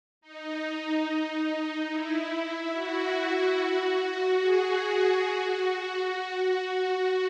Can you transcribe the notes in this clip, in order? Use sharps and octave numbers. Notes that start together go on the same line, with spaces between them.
D#4
D#4
E4
F#4
G#4
F#4
F#4